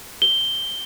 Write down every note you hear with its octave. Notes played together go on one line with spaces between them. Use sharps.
G7